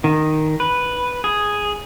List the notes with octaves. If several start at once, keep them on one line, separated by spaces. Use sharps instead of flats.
D#3
B4
G#4